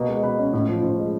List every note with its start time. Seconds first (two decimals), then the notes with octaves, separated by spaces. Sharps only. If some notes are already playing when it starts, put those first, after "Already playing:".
Already playing: B2 A#3
0.08 G#3
0.23 B2 B4
0.39 C#4
0.53 A2
0.68 F3
0.83 A2 C5
0.99 G#3